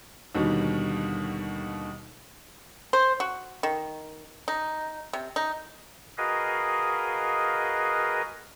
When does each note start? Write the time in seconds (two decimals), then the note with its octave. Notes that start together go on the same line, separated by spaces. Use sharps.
0.35 D#2 B2 D3 D#3 G3
2.93 C5
3.20 F#4
3.63 D#3
4.48 D#4
5.13 C3
5.36 D#4
6.18 F#4 G#4 A#4 B4 D#5 F5